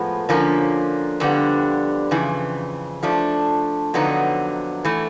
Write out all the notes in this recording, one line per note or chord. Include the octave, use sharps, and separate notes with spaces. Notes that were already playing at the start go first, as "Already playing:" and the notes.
Already playing: A2 F3 G#3 B3
D3 F3 A#3 C#4
F2 D3 G3 B3
F2 C#3 E3
F3 A3 D4
F2 D3 F#3 B3 D#4
E3 A3